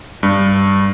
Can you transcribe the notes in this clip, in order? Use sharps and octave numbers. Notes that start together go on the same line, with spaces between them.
G2